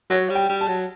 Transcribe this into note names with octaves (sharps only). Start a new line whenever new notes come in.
F#3 C#5
G3
G5
G3
A5
F#3